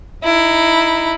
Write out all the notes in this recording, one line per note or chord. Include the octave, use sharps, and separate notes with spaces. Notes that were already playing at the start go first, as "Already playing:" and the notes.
D#4 E4